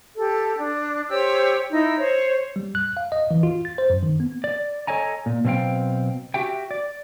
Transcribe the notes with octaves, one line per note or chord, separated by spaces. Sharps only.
G4 A4
D4
G4 C5 C#5 E6
D#4 E4 E6
C5 C#5
G3
F#6
F5
D#5
E3
F4
A6
C5
F#2
D#3
B3
D5
A4 C#5 D#5 G#5 A#5
A#2
B2 F#3 C4 G4 F5 G5
F#4 G4 E5 G5
D5